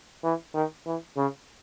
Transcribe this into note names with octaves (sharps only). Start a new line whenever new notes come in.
E3
D#3
E3
C#3